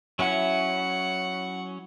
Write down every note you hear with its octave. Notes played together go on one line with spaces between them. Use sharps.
F#3 C#4 E4 F#5 B5